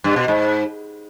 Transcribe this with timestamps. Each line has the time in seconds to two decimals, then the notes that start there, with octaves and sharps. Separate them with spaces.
0.04 G2
0.16 B2
0.28 G#2